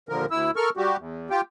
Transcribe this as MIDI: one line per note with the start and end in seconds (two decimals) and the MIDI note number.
0.09 0.26 39
0.09 0.26 46
0.09 0.26 50
0.09 0.26 53
0.09 0.26 70
0.31 0.51 38
0.31 0.51 64
0.31 0.51 88
0.56 0.70 69
0.56 0.70 70
0.56 0.70 85
0.56 0.70 89
0.77 0.96 55
0.77 0.96 66
0.77 0.96 67
0.98 1.29 40
1.30 1.41 65
1.30 1.41 67
1.30 1.41 79